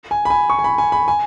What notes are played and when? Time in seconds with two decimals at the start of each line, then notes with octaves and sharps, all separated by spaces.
0.11 G#5
0.25 B5
0.30 G#5
0.50 C#6
0.59 G#5
0.64 B5
0.78 G#5
0.92 B5
1.08 G#5